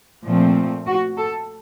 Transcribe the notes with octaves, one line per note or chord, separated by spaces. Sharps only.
A#2 F3 A3 C4
F#4
A4